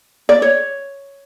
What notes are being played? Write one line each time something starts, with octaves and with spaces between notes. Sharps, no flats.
D5
C#5